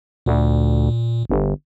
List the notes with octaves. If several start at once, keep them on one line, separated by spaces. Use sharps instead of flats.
D2 A#2
G1